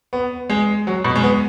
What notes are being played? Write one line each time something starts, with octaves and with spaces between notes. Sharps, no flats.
B3
G#3
F#3
B2
G#3
B3